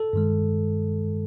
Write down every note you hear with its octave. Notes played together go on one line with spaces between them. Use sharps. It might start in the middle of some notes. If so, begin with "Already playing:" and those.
Already playing: A4
G2 D#3 G#3